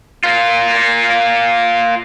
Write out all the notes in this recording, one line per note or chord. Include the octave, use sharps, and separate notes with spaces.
A#3 F4